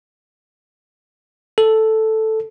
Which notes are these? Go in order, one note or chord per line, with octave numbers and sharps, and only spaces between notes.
A4